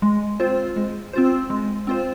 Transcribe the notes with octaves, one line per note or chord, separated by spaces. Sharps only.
G#3
C4 F4 C5
G#3
C4 F4 C5
G#3
C4 F4 C5